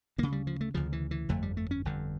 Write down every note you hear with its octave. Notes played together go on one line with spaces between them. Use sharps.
D2 C#3 A#3
G3
F3
A3
D2 C#3 F3
E3
E3
G1 F2 D3 A3
G3
A3
C#4
G1 F2 D3